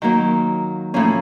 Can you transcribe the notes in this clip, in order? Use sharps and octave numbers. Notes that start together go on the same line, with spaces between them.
D#3 F#3 A#3
A2 F3 A#3 C#4